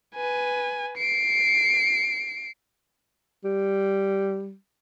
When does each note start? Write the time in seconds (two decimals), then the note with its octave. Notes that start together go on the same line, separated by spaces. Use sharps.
0.15 B4 G#5
0.98 C7 D7
3.45 G3